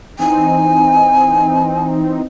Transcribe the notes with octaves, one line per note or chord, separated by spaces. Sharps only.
E3 C4 D#4 G#5